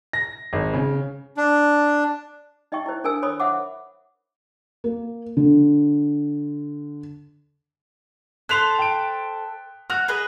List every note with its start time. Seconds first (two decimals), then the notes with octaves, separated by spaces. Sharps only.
0.13 A#6
0.53 G#1
0.73 C#3
1.37 D4
2.72 D#4 D#5 E5 G5 C#6
2.86 E4 C5
3.04 D4 A4 A#4 G#5 E6
3.22 A4 C5 C#5 G#5 B5 D#6
3.40 C5 E5 F#5 D6
4.84 A#3
5.37 D3
8.49 A4 C5 C6 F#6 B6 F7
8.79 G5 D7
9.90 F#4 F6 F#6 F7
10.08 G#4 B4 D#5